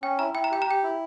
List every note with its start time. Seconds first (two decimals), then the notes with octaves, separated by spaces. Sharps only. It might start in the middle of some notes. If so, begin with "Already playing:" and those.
0.03 C#4 G5
0.19 E4 A#5
0.34 E4 G5
0.44 A#5
0.51 G4 G5
0.62 A#5
0.67 G4 G5
0.83 E4